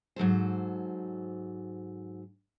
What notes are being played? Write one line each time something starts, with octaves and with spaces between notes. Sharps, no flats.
G#2 F#3 A4 C5